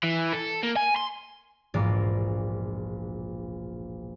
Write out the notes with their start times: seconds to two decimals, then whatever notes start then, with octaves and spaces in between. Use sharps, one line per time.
0.04 E3
0.33 A4
0.63 A#3
0.76 G#5
0.96 C6
1.74 E1 A#1 G#2 F4 D5 A#5